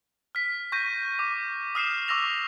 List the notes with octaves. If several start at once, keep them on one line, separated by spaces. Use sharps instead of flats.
F6 B6
C#6 G6 A#6 D#7
D6
D#6 F6 C7 E7
C#6 D6 E6 A#6 F7